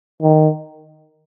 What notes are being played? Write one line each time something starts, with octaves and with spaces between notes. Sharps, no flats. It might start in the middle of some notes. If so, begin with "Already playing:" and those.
D#3